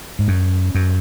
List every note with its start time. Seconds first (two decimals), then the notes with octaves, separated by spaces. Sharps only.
0.19 G#2
0.28 F#2
0.75 F#2